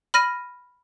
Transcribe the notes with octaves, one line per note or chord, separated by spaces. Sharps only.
B5 F6 A#6 D#7